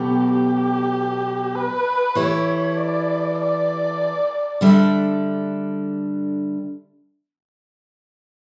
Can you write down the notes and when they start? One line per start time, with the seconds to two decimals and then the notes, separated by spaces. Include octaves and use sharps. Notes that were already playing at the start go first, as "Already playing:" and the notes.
Already playing: B2 F#3 A3 G4
0.32 G4
1.55 B4
2.15 E3 A3 E4 G4 C#5
2.77 D5
3.39 D5
4.61 D3 G3 D4 A4 E5